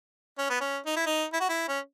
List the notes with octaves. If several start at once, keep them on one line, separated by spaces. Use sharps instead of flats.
C#4
B3
C#4
D#4
E4
D#4
E4
F#4
E4
C#4